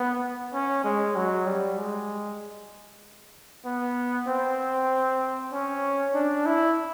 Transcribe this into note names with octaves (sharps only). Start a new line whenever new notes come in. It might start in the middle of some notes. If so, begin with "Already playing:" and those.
Already playing: B3
C#4
G#3
F#3
G3
G#3
B3
C4
C#4
D4
E4